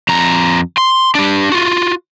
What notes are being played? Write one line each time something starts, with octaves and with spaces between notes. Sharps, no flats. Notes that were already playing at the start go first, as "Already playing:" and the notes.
F2 A#5
C6
D4 G4
F4 F#4